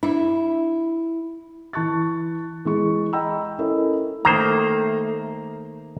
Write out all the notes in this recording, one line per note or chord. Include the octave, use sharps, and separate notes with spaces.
D4 E4 E5
E3 A5 C#6 F#6 A6
E3 G#3 C#6
D#5 G5 A#5 B5 E6
C#4 E4 A4 A#4 D#5
D#3 A3 A#3 C5 A#5